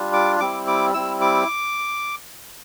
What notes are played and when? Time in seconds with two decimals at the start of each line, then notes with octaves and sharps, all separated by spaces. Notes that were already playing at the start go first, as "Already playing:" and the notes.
Already playing: G3 D4 F4
0.13 D6
0.40 G3 C4 E4 D6
0.67 D6
0.94 G3 C4 E4 E6
1.21 D6